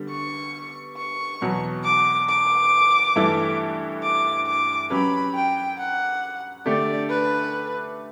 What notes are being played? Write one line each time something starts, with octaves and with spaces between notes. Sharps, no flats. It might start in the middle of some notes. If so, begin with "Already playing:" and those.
Already playing: D3 G3 B3
C#6
C#6
E2 B2 F#3 B3
D6
D6
G2 E3 A3 E4 A4
D6
D6
F#3 C#4 G4 B4 B5
G5
F#5
D3 A3 D4 G4 D5
B4